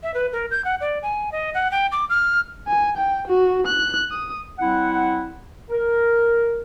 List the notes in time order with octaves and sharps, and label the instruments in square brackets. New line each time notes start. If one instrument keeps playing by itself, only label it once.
[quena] E5
B4
A#4
G6
F#5
D5
G#5
D#5
F#5
G5
D6
F6
[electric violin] G#5
G5
F#4
F#6
D#6
[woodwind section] G3 C4 E4 F#5
A#4